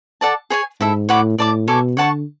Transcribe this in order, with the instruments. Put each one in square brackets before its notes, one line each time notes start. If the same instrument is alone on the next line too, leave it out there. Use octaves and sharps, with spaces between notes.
[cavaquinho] A4 D5 F#5 A5
G#4 C#5 G#5
[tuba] G#2 [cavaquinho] E4 A4 E5
[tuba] A2 [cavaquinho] C#5 F#5 B5 D6
[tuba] A2 [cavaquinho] D5 A5 D6
[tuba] B2 [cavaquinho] A4 C#5 G#5 D6
[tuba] D3 [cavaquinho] C#5 F#5 A5 C#6